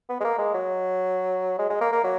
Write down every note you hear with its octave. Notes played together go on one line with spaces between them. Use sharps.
B3
G#3
A#3
G#3
F#3
G#3
G#3
A#3
A#3
F#3